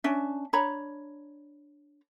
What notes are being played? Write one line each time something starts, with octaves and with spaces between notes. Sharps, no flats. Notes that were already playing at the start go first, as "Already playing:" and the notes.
C#4 D4 E5
D4 C#5 A#5 B5